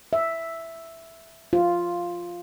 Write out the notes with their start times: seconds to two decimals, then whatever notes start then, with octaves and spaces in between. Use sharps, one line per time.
0.13 E5
1.53 F4